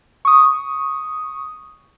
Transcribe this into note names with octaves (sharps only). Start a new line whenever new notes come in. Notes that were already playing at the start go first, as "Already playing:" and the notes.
C#6 D#6